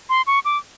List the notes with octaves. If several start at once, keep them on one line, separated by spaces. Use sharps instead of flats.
C6
C#6
D6